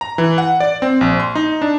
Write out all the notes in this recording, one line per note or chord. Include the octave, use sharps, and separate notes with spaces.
A#5
E3
F#5
D5
C4
A#1
C6
D#4
D4